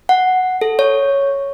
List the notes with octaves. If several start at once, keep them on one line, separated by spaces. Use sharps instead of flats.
F#5
A4
C#5